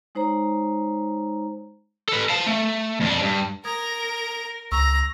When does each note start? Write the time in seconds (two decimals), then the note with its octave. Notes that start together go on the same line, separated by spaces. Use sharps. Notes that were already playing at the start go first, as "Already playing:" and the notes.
0.15 G#3 D#4 C5 C#5 A#5
2.09 A4 B4
2.30 F5 A5
2.47 A3
3.01 F2 D4
3.22 G2
3.65 A#4 A#5 D#6 G#6
4.72 C#2 A#5 C#6 E6 A#6